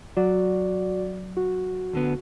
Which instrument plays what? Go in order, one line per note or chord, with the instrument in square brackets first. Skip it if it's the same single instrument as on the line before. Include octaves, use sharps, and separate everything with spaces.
[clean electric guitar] F#3 [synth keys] F#4 D5
[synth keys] F#4
[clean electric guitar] D2 D3 B3